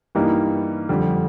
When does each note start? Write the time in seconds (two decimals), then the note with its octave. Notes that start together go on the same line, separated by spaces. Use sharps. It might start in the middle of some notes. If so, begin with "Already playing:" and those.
0.15 G2 E3 G3 A#3 D#4
0.89 F2 D3 G3